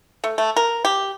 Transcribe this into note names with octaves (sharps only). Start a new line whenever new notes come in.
A3
A3
A#4
G4